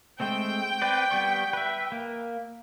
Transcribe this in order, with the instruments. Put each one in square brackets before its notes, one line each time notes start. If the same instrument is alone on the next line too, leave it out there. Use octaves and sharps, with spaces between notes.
[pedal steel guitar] G#3 A3 C4 [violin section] G5
[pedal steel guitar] C4 B4 D5
G3 B3 C#6
B4 E5
A#3